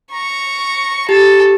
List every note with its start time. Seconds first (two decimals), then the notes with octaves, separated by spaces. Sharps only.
0.13 A#5 C#6
1.09 G4 A4